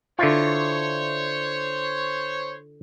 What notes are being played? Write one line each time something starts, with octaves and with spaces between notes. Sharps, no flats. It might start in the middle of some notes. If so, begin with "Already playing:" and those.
D3 E4 F4 C5 C#5